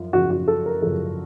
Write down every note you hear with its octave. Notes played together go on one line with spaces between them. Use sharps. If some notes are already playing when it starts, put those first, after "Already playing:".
Already playing: F#2 F3 F4
F#2 C#3 F3 F#4
F#4
A4
A#4
F#2 C#3 F3 A4